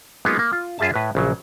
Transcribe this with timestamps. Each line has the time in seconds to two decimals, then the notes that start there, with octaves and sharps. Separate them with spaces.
0.25 F#3 G#3 A#3 B3 D#4 F4
0.39 A#3
0.53 F4
0.79 F#2 F4 G#4 E5 A5
0.94 A2 B4
1.15 A#1 C#3 F#3